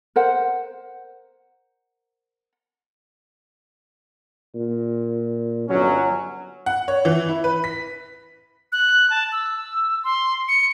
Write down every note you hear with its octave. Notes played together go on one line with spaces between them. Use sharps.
A#4 C5 F#5
A#2
G1 F#3 C#4
F#5
C#5
E3
E4
B4
B6
F#6
A5
E6
C6
C#7